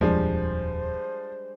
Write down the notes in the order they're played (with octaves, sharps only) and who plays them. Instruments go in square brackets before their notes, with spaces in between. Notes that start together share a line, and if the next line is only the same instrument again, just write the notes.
[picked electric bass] D#1 F2 [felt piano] F3 [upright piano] G3 G#3 D4 [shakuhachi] C5